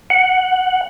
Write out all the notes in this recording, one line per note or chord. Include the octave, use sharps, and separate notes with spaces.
F#5